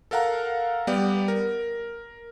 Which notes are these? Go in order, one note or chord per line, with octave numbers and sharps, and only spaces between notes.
A4 A#4 F5 F#5 A#5
G3 B3 G4 D5
A#4